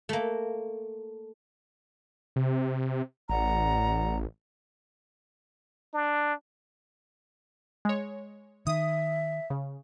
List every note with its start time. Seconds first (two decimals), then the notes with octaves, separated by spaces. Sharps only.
0.09 A3 A#3
2.36 C3
3.29 A1 D5 F#5 A#5
5.94 D4
7.85 G#3 C#5
8.67 D#3 E5 D#6
9.50 C#3